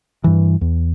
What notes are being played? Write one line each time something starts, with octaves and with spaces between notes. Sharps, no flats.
G2 E3
E2